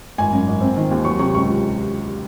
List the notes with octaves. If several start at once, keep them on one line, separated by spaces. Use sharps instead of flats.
G#1 G#5
F#2
G#1
C4
D#3
D#2
F#3 C#6
C3 C#6
C#2 C#6